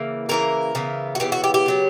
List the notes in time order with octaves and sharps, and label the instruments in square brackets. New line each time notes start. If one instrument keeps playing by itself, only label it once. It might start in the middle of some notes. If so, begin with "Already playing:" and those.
Already playing: [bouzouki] C#3 E3 A#3
C#3 E3 A#3 A#4
C#3 E3 B3
F#4
C#3 E3 B3 G4
F#4
G4
G4
C#3 F#3 B3